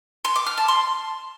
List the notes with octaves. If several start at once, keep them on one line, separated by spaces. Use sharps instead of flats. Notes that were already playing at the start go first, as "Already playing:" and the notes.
C6
D6
F6
A5
C6